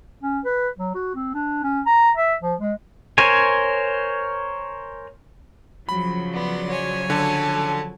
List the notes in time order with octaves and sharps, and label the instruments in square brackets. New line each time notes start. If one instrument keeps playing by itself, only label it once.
[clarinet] C#4
B4
F#3
F#4
C4
D4
C#4
A#5
E5
F3
G#3
[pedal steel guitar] A#4 C5 C#5 G#5
[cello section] C#3 F3 F#3 [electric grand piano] B5
[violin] B3 [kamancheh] D5 C6
[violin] C#5 G#5
[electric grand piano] D3 [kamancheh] A4 A5